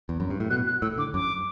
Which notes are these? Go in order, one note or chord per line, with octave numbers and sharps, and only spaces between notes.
E2
F#2
G2
A2
B2 F#6
F#6
A2 E6
D3 D6
F#2 D6